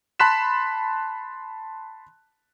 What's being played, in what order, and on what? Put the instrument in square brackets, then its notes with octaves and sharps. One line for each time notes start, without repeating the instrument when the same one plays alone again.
[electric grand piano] A5 B5 C6 F#6 B6 E7